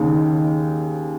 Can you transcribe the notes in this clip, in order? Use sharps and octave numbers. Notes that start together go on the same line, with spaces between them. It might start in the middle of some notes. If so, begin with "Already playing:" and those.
Already playing: D#2 C#3